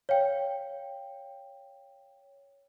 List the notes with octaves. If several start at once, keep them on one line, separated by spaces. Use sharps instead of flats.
C#5 F5 G5